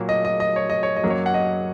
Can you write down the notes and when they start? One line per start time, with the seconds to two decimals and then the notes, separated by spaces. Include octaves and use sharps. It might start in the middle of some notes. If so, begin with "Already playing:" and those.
Already playing: A#2 F#3 A#3
0.09 D#5
0.25 D#5
0.40 D#5
0.56 C#5
0.70 D#5
0.83 C#5
0.97 D#5
1.03 F#2 F#3 A#3
1.10 C#5
1.26 F#5
1.34 D#5